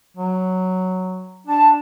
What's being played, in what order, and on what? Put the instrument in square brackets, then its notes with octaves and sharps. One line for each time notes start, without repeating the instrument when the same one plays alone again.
[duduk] F#3
[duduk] D4 [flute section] A5